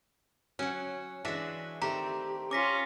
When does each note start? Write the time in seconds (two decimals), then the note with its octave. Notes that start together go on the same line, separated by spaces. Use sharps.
0.59 F#3 C#4 F#5
1.25 E3 G#3 D4 F#4 E5
1.82 D#3 A3 C4 G4 A#5
2.51 C#4 F4 D6 A#6 B6